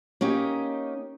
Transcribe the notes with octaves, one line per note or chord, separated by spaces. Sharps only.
A#3 C#4 D#4 G4